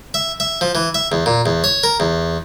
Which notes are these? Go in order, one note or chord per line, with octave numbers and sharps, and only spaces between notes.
E5
E5
F3
E3
E5
E2
A#2
E2
C#5
A#4
E2